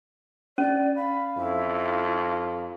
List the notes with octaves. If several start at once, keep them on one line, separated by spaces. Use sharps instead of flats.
C#4 D5
F5 B5
F2 E4